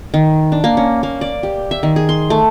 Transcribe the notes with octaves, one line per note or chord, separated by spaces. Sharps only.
D#3
D4
A#3
C#4
A#3
D5
G4
E5
D#3
G#4
C6
A3